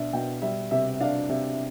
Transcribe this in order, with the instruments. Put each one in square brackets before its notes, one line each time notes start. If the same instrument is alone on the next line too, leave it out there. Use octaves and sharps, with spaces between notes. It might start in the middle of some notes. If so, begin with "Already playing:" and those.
Already playing: [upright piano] B2 D4 E5
B2 G5
G3 E5
C3 E5
D4 F5
C3